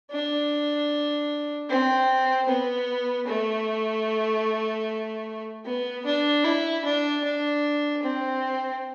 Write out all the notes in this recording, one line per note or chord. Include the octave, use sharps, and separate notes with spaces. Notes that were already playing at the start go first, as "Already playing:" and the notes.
D4
C4
B3
A3
B3
D4
E4
D4
D4
C4